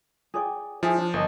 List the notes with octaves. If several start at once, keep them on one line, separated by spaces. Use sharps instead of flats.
G#4 D5 G5
F3 E4 G#4
D4
G1 A#4 D#5 A5